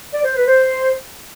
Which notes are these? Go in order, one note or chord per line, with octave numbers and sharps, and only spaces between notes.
D5
C5
B4
C5